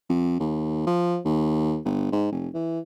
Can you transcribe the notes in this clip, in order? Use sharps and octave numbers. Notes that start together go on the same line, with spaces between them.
F2
D#2
F3
D#2
G1
G#2
F1
E3